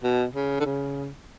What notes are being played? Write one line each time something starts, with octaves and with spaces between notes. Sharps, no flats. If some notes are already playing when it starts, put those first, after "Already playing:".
B2
C#3
D3
C#3